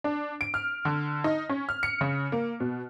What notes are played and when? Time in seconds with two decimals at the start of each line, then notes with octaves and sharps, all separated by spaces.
0.04 D4
0.41 D7
0.54 F6
0.85 D3
1.24 D#4
1.49 C#4
1.69 F6
1.83 C#7
2.01 C#3
2.32 A#3
2.60 B2